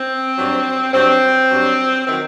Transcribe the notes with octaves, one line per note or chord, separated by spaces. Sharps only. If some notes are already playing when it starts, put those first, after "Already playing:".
Already playing: C4
G2 F#3
G2 F#3 C4
G2 F#3
D#3 F#3 C4